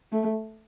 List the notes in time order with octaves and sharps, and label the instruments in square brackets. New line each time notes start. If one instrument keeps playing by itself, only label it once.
[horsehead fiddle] A3